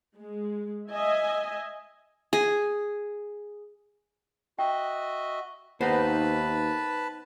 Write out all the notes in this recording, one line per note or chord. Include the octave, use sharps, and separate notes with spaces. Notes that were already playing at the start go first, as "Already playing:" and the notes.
G#3
D#5 E5 G#5
G#4
F#4 D#5 E5 G5
D#2 B3 D#4 B4 C5 A5 B5